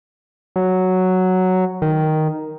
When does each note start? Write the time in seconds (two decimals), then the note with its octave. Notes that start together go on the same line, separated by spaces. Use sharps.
0.56 F#3
1.82 D#3